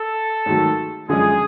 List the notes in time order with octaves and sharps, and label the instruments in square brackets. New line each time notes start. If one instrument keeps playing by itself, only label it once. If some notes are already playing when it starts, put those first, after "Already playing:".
Already playing: [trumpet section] A4
[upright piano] G#2 D#3 F#3 A3
[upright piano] F#2 D3 F3 G#3 [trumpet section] G#4